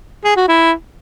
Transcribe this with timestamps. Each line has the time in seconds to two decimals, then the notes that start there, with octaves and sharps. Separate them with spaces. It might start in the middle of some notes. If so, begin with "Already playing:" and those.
0.24 G#4
0.36 F#4
0.48 E4